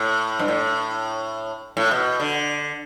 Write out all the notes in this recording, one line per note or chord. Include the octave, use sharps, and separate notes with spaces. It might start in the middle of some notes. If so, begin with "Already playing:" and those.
Already playing: A2
G2
A2
A2
B2
D3